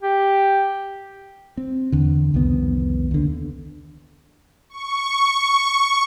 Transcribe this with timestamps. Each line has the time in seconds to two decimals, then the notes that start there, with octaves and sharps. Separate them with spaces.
0.03 G4
1.57 C4
1.92 E2 D3
2.34 C2 F2 D#3 B3
3.11 D#2 D3
4.70 C#6